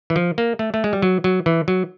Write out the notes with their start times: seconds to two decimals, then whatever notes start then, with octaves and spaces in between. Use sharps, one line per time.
0.10 E3
0.16 F3
0.38 A#3
0.59 A3
0.74 A3
0.84 G#3
0.93 G3
1.02 F#3
1.24 F#3
1.46 E3
1.68 F#3